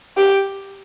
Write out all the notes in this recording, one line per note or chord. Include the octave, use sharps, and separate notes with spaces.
G4